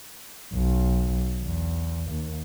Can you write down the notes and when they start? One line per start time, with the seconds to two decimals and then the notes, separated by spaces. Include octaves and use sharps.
0.53 B1
1.44 E2
2.10 D#2